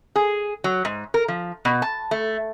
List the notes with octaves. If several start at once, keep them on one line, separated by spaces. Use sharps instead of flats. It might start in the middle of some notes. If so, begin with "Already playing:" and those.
G#4
F#3
G#2
A#4
F3
B2
A5
A3